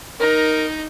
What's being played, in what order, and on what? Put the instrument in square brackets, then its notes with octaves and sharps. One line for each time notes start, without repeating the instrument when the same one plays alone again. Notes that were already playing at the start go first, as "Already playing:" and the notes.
[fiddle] D#4 [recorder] A#4